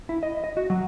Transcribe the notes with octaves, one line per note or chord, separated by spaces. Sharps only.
E4
D#5
D#5
F#4
F#3